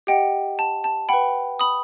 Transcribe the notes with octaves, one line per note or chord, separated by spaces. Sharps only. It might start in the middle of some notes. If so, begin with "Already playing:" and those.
G4 D#5 F#5 G5
A5
A5
B4 F#5 G5 B5
B5 D#6